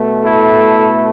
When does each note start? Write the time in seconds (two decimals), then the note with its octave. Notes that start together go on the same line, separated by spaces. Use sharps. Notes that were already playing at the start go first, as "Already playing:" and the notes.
Already playing: B2 A3
0.25 E4 A4